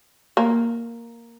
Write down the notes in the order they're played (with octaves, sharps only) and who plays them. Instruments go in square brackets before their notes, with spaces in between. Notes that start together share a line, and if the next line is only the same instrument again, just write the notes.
[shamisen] A#3